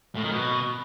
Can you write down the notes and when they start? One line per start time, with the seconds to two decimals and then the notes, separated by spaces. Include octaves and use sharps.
0.15 A2
0.23 D#3
0.31 B2